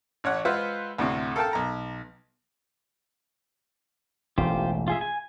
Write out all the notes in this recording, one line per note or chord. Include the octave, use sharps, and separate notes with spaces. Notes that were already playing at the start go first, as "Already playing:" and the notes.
A1 C#5 F#5
G#3 F4 B4 C5 E5 F#5
D2 A2 C3
A4 A#4 F5 G5 A5
B1 A#5
E1 A1 A3 F4 G4 C5
F4 G#4 E5
G#5